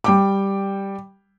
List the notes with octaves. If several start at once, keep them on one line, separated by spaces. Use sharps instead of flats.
G3 G5 D6